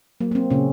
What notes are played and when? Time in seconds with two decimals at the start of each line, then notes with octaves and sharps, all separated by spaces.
0.21 F#3 A#3
0.31 A#3
0.35 C4
0.51 A#2 C#3 C#4